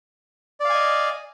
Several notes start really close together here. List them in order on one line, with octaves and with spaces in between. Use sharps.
D5 F5 G#5 D#5